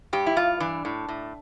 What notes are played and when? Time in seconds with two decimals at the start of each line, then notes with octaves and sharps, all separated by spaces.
0.13 G2 G4
0.26 E4
0.36 G2 F4
0.60 E3 D4
0.85 A2
1.08 A2